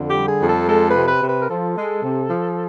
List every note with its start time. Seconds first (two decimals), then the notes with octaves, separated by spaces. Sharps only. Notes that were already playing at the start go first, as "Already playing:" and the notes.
Already playing: F2 D3
0.09 G4
0.16 G3
0.28 G#4
0.42 F2
0.49 A4
0.68 G#3 A4
0.89 B4
0.95 C3
1.08 B4
1.22 C3
1.29 B4
1.40 A#4
1.48 F3 A4
1.75 G#3
2.02 C3
2.29 F3